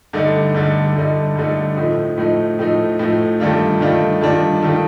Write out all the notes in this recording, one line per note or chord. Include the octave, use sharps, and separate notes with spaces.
G2 D3 A3 D#4
G2 D3 A3 D#4
G2 D3 A3 D#4
G2 D3 A3 D#4
A2 F3 A3 D#4
A2 F3 A3 D#4
A2 F3 A3 D#4
A2 F3 A3 D#4
G2 D#3 A3 D4 F4
G2 D#3 A3 D4 F4
G2 D#3 A3 D4 F4
D#3 A3 D4 F4